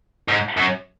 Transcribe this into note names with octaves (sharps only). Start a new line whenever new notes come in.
G#2
F#2